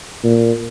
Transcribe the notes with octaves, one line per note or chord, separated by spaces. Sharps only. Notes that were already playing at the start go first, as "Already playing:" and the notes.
A#2